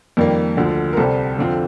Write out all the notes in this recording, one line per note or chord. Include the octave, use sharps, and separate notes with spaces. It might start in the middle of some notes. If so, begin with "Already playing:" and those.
F2 D#3 G3 A#3
D2 D3 F3
A#4
C2 C3 G3 A4 C5
F2 D3 F3 C4 F4